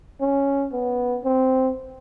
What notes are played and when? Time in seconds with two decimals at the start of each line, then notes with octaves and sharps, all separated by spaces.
0.21 C#4
0.72 B3
1.24 C4